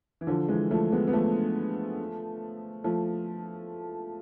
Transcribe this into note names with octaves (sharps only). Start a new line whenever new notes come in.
E3
D3 F3
E3 G#3
F3 A3
G#3 B3
B3
F3 A3
F3 A3